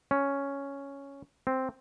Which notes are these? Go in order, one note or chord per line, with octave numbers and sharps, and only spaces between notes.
C#4
C4